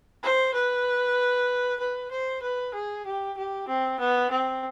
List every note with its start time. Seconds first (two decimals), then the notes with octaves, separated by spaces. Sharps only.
0.23 C5
0.54 B4
1.80 B4
2.11 C5
2.42 B4
2.74 G#4
3.06 G4
3.37 G4
3.68 C4
4.00 B3
4.31 C4